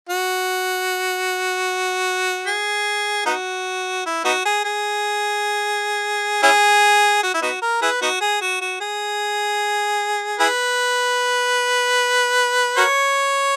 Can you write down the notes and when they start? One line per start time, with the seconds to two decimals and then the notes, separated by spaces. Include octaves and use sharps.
0.09 F#4
2.47 G#4
3.26 B3 D#4 F#4
4.06 E4
4.25 B3 D#4 F#4
4.45 G#4
4.64 G#4
6.43 C#4 E4 G#4
7.23 F#4
7.34 E4
7.42 B3 D#4 F#4
7.61 A#4
7.82 E4 G#4 B4
8.02 B3 D#4 F#4
8.21 G#4
8.41 F#4
8.61 F#4
8.80 G#4
10.40 E4 G#4 B4
12.77 F#4 A#4 C#5